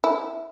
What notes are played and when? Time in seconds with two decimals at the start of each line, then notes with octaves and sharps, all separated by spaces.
0.04 E4